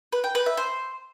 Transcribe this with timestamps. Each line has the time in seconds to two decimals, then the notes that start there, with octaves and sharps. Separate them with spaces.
0.12 B4
0.24 G5
0.35 B4
0.46 E5
0.57 C5